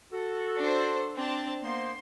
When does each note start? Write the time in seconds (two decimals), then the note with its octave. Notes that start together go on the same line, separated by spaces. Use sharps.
0.12 F#4 A4
0.59 D4 C5
1.16 C4 D4 A5
1.63 A#3 B3 C5 C6